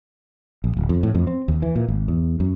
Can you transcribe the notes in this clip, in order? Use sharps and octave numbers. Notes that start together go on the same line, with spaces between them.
A#1
D1
F2
A2
F2
C4
D#2
E3
A#2
G#1
E2
F#2